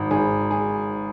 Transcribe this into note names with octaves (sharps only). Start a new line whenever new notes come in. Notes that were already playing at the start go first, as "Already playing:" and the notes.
Already playing: G#1
G#1 G#4
G#4